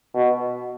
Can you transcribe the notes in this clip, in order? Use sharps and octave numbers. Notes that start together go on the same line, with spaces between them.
B2